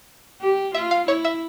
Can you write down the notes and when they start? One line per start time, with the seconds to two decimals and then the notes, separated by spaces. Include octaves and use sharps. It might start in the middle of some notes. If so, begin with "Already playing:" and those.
0.41 G4
0.75 F4 E5
0.91 F5
1.08 E4 C#5
1.25 E5